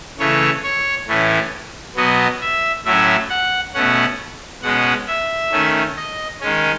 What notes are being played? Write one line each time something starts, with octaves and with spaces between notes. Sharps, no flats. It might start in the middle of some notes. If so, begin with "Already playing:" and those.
C#3 E3 A3 C#5
C#5
A2 E3 A3 C#4
B2 F#3 B3 D#5
E5
A2 F#3 C#4 E5
F#5
B2 A3 C#4 F#5
B2 G#3 C#4 F#5
E5
D#3 A3 C#4
D#5
D#3 G#3 C#4